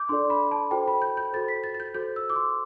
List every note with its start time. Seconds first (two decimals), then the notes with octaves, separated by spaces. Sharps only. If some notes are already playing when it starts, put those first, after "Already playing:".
Already playing: D6 G6
0.09 D4 A4 D5 C6
0.30 B5
0.51 A5
0.71 F#4 A4 C5 G5
0.87 B5
1.02 G6
1.17 G6
1.33 F#4 A4 C5 A6
1.48 B6
1.64 A6
1.74 A6
1.80 G6
1.94 F#4 A4 C5 G6
2.16 E6
2.30 D6
2.36 C6